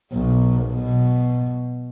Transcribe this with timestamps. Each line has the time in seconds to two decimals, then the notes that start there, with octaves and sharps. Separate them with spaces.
0.13 B1
0.74 B2